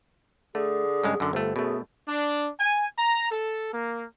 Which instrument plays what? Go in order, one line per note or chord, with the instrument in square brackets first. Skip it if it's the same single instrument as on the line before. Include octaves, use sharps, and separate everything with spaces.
[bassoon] D3 [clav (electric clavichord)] A3 [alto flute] G#4
[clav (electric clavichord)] G2 C#3 G#3
F#2 D3
[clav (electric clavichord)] G1 A3 [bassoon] F2
[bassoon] F#2 [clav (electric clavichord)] B2 A3 [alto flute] G#4
[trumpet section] D4
G#5
A#5
A4
A#3